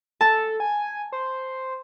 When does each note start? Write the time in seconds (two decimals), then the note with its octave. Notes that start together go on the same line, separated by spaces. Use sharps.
0.21 A4 A5
0.60 G#5
1.12 C5